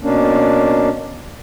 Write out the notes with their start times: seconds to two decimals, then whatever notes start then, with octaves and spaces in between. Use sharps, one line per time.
0.02 B2 A#3 C#4 D4